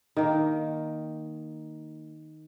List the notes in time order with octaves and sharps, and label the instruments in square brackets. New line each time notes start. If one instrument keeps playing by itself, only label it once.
[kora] D#3 A#3